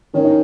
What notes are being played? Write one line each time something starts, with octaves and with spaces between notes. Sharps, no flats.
D#3 C#4
D#4